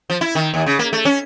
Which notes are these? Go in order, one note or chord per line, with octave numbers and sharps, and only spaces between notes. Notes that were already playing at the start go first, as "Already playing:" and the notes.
F3
E4
D#3
D#2
C#3
A#3
A3
C#4